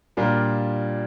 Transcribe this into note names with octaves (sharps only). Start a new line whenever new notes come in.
A#2 G3 D4 F4 A#4